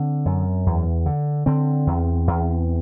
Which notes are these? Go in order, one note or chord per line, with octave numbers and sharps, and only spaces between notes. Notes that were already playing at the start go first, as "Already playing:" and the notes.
Already playing: D3 C4
F#2
E2
D3
D3 C4
E2
E2